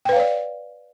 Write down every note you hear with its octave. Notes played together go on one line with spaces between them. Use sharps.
B4 C#5 D5 F5 G5